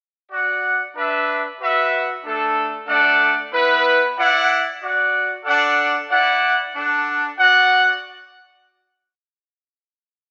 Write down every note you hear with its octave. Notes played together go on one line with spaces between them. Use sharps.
F#4 D5 F#5
D4 B4 E5
F#4 B4 E5
A3 D4 A4
A3 D4 A4 D5 F#5
B3 E4 B4
E4 D5 F#5
F#4 D5 F#5
D4 A4 D5 F#5
E4 D5 F#5
D4 A4 F#5
F#4 D5 F#5